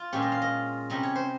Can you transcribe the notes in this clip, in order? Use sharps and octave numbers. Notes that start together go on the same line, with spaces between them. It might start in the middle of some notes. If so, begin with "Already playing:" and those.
Already playing: F4
A#2 G#3 C#4 G4
D#5
F5
D#5
C3 G3 C#4 D#5
C#5
C5